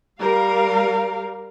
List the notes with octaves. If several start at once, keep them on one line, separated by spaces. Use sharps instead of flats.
G3 A#4 F5